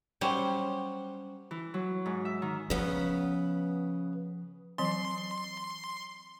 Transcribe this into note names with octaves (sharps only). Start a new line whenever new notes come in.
F#3 G3 C#4 C5
E3
F#3
G#2
E5
D#3
C#3 F3 B3
E3 F#3 C4 C6